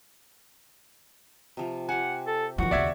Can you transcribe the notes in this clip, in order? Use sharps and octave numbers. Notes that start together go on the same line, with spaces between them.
C3 F3 F4
G4 C5 F#5 G#5
A4
D#3 F3 F#4
D#2 C#3 D5 E5 G#6